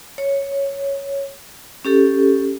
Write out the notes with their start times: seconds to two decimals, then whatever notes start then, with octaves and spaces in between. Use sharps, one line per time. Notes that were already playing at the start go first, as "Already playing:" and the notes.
0.18 C#5
1.85 C#4 G4 A4